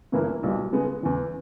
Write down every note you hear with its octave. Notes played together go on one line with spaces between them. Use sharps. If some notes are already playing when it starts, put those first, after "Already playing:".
G1 G2 E3 A#3 E4
B1 A#2 G3
C#3 G#3 B3
E2 C#3 E3